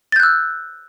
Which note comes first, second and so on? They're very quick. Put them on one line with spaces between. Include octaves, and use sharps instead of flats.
A6 G6 F#6 E6